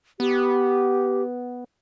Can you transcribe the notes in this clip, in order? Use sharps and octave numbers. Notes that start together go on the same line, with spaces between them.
B3 G4